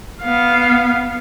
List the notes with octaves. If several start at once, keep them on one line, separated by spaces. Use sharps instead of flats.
B3 F5